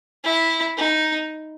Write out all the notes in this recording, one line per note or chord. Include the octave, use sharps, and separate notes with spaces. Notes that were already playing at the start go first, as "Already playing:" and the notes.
E4
D#4